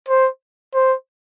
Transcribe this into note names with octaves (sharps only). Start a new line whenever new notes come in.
C5
C5